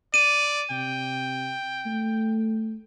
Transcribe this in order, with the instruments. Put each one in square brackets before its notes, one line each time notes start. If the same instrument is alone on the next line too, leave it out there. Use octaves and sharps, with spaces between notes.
[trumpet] D5 [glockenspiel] D#7
[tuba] C3 [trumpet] G5
[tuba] A3